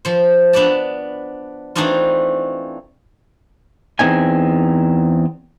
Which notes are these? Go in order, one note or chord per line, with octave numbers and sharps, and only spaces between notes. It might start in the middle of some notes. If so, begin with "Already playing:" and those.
F3 C5
B3 D4 B4 D5 A5
E3 A3 C4 D4 D#4 F4
E2 A#3 C4 D#4 G#5